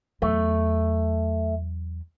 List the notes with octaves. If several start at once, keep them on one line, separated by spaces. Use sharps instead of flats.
E2 F#3 A3